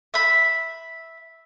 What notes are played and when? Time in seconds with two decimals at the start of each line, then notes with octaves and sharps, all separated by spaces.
0.14 E5 B5